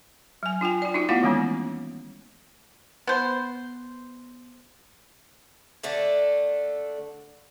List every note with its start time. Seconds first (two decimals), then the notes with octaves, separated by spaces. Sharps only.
0.43 F#3 G#5
0.61 D4 F4 G5 G#5
0.82 F4 D5
0.94 D4 D#4 F#4
1.09 A3 B3 E4 F4 F5 F#5
1.23 D#3 E3 G3 G#3 A#3 C#4
3.07 B3 C5
5.83 D3 A3 D4